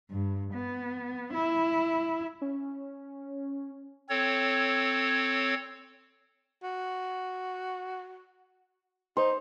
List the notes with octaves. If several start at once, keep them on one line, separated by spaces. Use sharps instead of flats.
G2
B3
E4
C#4
C4 A4 C#5
F#4
D#4 C5